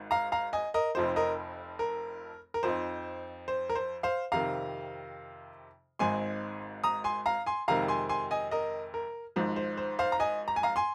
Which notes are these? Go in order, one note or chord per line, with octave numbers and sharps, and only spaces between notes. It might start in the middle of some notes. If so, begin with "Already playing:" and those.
Already playing: G#1 G#2
F5 A#5
F5 A#5
D#5 G#5
A#4 D#5
F1 F2 F3 C4 D#4 C5
A#4 D#5
A#4
A#4
F2 F3 C4 D#4 C5
C5
A#4
C5
C5 F5
F2 C3 D#3 F5 A#5
G#1 G#2 G#3 C4 G#5 C6
A#5 D#6
G#5 C6
F5 A#5
G#5 C6
F2 C3 D#3 G#3 F5 A#5
G#5 C6
G#5 C6
D#5 G#5
A#4 D#5
A#4
G#1 G#2 F3 C5
C5
C5
C5 F5
A#5
D#5 G#5
A#5
G#5
F5 A#5
G#5 C6